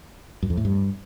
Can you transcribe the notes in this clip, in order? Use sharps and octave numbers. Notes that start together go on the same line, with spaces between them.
F#2
F2
A2
G2